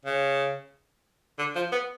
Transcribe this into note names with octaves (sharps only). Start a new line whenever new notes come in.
C#3
D3
F3
B3